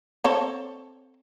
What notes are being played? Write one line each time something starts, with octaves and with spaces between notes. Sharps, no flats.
C4 A4 C#5